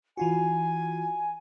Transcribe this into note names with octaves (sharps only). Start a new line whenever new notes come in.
E3 F4 F#4 G#5